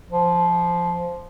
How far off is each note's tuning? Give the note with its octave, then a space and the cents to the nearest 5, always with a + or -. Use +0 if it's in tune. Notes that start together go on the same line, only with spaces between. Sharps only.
F3 -10